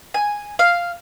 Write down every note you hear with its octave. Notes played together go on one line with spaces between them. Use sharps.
G#5
F5